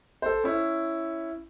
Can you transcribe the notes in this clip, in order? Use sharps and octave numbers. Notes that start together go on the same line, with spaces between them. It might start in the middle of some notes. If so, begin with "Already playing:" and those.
A4 C5
C#4 E4